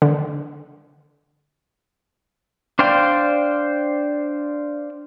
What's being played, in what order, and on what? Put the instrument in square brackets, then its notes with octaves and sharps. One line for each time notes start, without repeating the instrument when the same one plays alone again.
[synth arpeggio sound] D3
[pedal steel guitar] D4 C5 D5 F5 G5